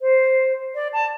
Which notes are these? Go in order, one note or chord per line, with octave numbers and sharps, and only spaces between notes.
C5
D5
A5